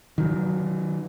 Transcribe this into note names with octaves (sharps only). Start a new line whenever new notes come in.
D#3 F#3